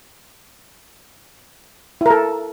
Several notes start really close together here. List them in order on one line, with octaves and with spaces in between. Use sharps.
E4 A#4 A4